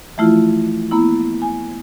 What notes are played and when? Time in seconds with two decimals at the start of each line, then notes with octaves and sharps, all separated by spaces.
0.18 E3 F3 A3 E4 F4
0.91 A#3 B3 E4
1.42 G#5